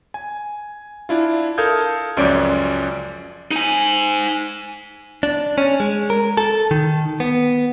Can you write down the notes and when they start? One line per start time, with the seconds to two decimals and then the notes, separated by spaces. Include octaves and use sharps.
0.14 G#5
1.09 D4 E4 F4
1.58 A4 A#4 F5 D#6 G6 G#6
2.17 C#2 F#2 F3 C#4 D5 D7
3.51 D#4 G#5
5.23 D4
5.58 C#4
5.80 G#3
6.10 A#4
6.37 A4
6.71 D#3
7.20 B3